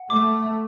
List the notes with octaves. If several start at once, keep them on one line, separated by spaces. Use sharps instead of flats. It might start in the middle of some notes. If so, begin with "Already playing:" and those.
Already playing: F#5
A3 D6